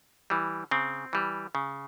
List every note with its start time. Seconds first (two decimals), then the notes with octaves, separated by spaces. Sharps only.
0.30 E3 G3
0.71 C#3 C4
1.13 E3 G3
1.55 C#3